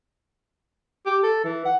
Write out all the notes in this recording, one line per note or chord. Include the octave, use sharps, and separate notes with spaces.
G4
A4
E3
F#5